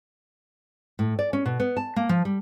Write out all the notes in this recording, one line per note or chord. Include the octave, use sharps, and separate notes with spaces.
A2
D5
C#4
B2
B3
A5
A#3
F3
G3